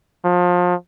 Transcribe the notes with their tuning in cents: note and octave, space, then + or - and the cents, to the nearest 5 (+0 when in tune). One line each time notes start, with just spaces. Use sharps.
F3 +30